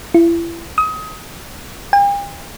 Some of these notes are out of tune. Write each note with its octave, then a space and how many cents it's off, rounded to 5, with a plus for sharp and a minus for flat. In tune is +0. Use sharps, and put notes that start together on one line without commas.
E4 +35
D#6 +25
G5 +45